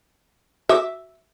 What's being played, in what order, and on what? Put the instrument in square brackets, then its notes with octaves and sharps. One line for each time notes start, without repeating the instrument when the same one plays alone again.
[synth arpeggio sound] F#4 D6 [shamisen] E5